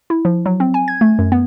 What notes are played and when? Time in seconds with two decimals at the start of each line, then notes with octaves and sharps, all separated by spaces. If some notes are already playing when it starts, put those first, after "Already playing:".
0.10 E4
0.25 F3
0.46 F#3
0.60 C4
0.74 G#5
0.88 G#6
1.01 A3
1.19 F#2
1.32 B3